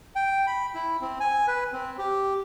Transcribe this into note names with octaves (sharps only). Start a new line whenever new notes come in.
G5
B5
E4
C4
G#5
B4
C4
G4